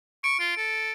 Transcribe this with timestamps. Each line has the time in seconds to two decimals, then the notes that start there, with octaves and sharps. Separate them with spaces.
0.24 C#6 D7
0.40 F4
0.57 A4